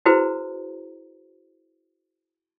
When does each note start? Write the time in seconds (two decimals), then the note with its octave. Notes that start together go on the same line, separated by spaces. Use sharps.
0.06 E4 F#4 G#4 B4 C5 A#5